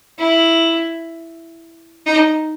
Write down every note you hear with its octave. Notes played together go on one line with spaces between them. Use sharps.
E4
D#4